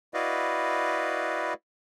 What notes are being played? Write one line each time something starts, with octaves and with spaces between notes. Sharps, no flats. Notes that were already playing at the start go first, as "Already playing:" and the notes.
E4 F#4 B4 D5 D#5 F5